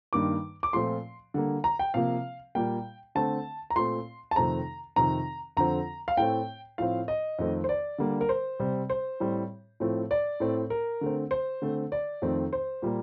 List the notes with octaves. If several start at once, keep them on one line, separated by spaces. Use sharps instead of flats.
G2 D#3 G3 A#3 D6
D6
A#2 F3 A3 C4 C6
D3 G3 A#3
A#5
G5
C3 F3 A#3 F5
A#2 G3 A#3 G5
D3 A3 C4 A5
A#5
A#2 A3 C4 C6
A5
F2 C3 D#3 A3 C4 A#5
F2 C3 D#3 A#5
F2 D3 F3 C4 A#5
F5
A2 A3 C4 G5
A2 F3 C4 F5
D#5
F2 D#3 A3 C4
C5
D5
D3 G3 A#3
A#4
C5
C3 G3 C4
C5
A2 G3 C4
A2 F3 A3 C4
D5
A2 A3 C4
A#4
D3 A3 C4
C5
D3 A3 C4
D5
F2 D#3 A3 C4
C5
A#2 G3 A#3